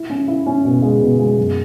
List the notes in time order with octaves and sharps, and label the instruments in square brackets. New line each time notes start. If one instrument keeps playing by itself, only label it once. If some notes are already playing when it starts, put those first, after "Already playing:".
Already playing: [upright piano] E4
C#4
E4
C#4
B2
G#3
B2
G#3
F#2